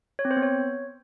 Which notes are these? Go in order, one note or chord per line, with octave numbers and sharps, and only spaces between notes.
C#5
C4
C5
B3
C#5